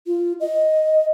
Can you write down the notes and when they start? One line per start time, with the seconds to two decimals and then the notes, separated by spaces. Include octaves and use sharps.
0.07 F4
0.40 D#5